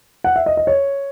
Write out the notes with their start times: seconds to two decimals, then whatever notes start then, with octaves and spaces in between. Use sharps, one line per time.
0.24 F#5
0.36 E5
0.46 D#5
0.57 D#5
0.67 C#5